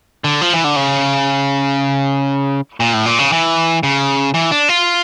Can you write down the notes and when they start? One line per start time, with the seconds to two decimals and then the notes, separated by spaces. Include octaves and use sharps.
0.24 D3
0.41 F3
0.53 E3
0.64 D3
0.76 C#3
2.80 A#2
2.93 A2
3.06 A#2
3.19 C#3
3.32 E3
3.83 C#3
4.34 E3
4.51 D4
4.69 F4